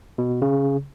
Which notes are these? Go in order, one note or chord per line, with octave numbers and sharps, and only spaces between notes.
B2
C#3